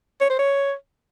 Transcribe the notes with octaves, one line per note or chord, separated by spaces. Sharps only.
C#5
C5
C#5